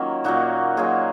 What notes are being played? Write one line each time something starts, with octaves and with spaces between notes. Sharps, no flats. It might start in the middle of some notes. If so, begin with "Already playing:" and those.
Already playing: D#3 F#3 A#3 C#4 F4
A#2 F#3 A#3 D#4 F#4
A#2 F#3 A#3 F4 G#4